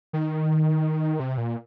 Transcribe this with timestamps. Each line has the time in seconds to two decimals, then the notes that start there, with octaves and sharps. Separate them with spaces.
0.13 D#3
1.20 C3
1.37 A#2